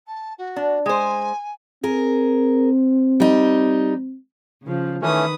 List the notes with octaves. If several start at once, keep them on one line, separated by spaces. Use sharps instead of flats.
A5
F#4
D4
G#3 C5 G#5
C4 G#4 A#4
G3 D#4
C#3 F3
D#3 E3 A3 C#4 B4 D#6